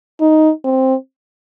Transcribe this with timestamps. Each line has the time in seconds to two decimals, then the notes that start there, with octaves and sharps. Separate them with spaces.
0.21 D#4
0.65 C4